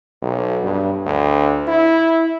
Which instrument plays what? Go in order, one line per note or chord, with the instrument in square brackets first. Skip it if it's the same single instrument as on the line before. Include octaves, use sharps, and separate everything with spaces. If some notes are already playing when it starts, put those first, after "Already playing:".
[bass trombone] B1
G2
D2
E4